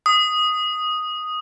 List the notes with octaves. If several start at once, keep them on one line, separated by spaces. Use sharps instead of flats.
D#6